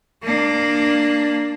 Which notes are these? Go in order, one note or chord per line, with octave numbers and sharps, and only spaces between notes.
A#3 D4